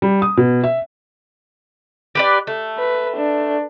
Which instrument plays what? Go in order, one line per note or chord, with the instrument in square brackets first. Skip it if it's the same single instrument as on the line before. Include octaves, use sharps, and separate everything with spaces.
[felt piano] G3
D#6
B2
E5
[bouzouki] G4 B4 D5
A3
[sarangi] B4
D4